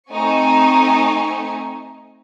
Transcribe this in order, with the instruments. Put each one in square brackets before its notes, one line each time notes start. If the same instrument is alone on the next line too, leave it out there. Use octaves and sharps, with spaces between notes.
[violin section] A3 C4 D#4 D#5 G#5 C#6